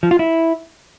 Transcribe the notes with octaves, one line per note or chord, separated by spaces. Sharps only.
F3
F4
E4